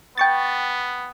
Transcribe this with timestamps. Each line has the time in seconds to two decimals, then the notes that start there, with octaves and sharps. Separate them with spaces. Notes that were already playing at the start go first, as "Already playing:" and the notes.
0.18 B3 G5 C#6 A6